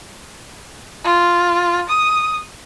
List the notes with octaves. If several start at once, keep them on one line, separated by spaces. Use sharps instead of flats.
F4
D#6